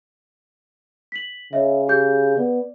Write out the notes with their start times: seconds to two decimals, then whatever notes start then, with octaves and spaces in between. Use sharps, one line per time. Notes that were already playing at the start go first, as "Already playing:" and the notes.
1.12 B6 F#7
1.53 C#3 C#5 D#5 E5
1.88 G4 G#4 G6
2.37 B3 D5